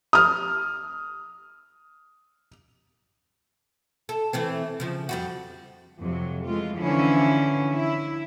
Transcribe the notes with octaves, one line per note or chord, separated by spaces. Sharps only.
D#6 F6
A4
E3 A3 C4
C#3 F3
F2 G3 F#4
F2 C3 F#3
E3 G#3 A3 F4
D3 E3 F3 C#4 E4
E4